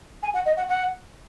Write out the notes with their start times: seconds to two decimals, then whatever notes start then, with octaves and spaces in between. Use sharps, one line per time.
0.23 G#5
0.34 F#5
0.46 D#5
0.57 F#5
0.69 F#5